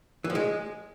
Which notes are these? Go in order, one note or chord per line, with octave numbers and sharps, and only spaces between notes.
E3
F3
G#3